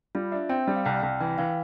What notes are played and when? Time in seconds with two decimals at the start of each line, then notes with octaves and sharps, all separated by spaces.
0.15 G3 F4
0.32 D4 E5
0.49 C4 G5
0.67 G3
0.76 F5
0.85 C2 G5
1.03 C2
1.20 E3 G5
1.38 E3 F5